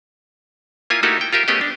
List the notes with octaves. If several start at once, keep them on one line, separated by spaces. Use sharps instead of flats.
A#3 E4 F4 G#5
A3 A#3 D#4 E4 F#4 G4
G5
F4 G4 A#4 E5
A3 B3 C#4 G4 G#4 D#5
D4